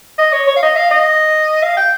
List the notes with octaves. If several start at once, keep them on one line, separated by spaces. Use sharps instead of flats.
D#5
C#5
C#5
F5
D#5
F5
D#5
F5
G5